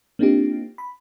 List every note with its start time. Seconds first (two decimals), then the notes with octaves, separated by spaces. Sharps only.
0.19 A#3 C4 D4 D#4 F4 G4
0.78 B5